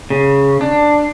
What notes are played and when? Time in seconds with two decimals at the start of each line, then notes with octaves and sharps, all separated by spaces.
0.10 C#3
0.61 D4